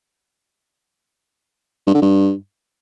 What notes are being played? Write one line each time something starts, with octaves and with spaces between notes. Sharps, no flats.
G2
D3
G2